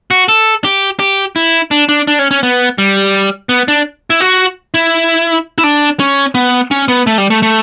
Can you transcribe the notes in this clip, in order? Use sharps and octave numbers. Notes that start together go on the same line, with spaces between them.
F#4
A4
G4
G4
E4
D4
D4
D4
C#4
C#4
B3
G3
B3
D4
E4
F#4
E4
E4
D4
C#4
B3
C#4
B3
A3
G3
A3
A3